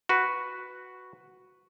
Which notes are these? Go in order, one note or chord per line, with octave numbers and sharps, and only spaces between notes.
F#4 B4